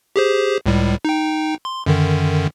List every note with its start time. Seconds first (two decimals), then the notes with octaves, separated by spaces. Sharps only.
0.16 G4 G#4 C5
0.66 C#2 A2 G3
1.05 D#4 G5
1.65 C6
1.86 F#2 D3 D#3